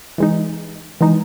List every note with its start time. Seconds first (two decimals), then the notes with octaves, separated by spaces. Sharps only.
0.18 E3 G#3 D#4
1.01 E3 G#3 D#4